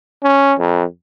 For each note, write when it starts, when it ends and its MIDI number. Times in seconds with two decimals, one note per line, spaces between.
0.23 0.54 61
0.59 0.84 41